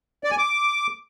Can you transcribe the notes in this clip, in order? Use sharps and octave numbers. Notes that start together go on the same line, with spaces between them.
D5
G#5
D6